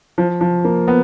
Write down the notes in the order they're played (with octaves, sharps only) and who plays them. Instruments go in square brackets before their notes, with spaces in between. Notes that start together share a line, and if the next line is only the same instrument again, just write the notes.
[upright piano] F3
F3
A#3
B3